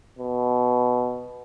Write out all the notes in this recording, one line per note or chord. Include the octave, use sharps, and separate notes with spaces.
B2